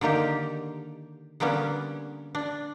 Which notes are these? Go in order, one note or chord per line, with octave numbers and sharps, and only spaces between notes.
D3 D#3 A#3 G4
D3 G3 A#3 B3 C#4
D4